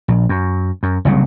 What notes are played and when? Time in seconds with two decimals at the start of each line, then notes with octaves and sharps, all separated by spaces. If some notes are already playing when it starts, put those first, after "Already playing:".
0.08 A#1
0.29 F#2
0.83 F#2
1.05 F#1 C2 C#3